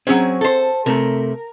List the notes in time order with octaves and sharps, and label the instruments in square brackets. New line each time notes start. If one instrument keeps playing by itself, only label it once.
[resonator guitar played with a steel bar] F#3 C#4 [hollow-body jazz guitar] C4 G#4
[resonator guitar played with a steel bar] A4 C5
[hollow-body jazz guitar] C3 A3 [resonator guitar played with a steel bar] A#4